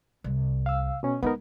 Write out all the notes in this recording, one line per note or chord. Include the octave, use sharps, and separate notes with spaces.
C2
F5 E6
B2 C#4
G#3 B3 D#4 A#4